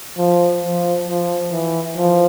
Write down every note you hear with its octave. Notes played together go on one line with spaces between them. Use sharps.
F3
F3
F3
E3
F3